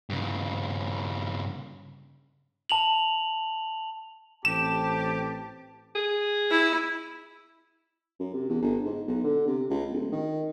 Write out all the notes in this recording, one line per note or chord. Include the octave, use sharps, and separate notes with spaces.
G2 C#3
A5 F7 F#7
A1 C4 G4 A5 E7
G#4
E4
F#2
C3
E2
G1
G#2
B1
D3
C3
C#2
D1
D#3